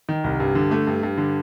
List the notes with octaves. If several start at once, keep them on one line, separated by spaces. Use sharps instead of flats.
D#3
C2
G2
D3
A3
G2
G2
D3